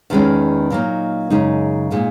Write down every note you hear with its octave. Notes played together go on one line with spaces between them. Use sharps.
E2 D#3 G#3 C#4
A#2 F#3 A#3 D#4
F#2 C#3 G#3 D#4
A#2 G#3 D#4